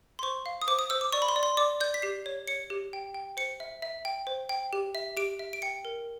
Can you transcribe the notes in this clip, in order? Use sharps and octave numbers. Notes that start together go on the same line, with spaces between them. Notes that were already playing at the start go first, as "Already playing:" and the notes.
C6
C5 C#6
F5
D#6
C5 D6
D#6
C5 E6
D6
D5 C#6
B5
C6
D5
C6
D5 D6
D5 G6
B6
G4 C7
C#5
C#5 C#7
G4
G5
G5
C5 C#7
E5
E5
G5
C5
G5
G4
E5
G4 D7
E5
D7
G5 C#7
A#4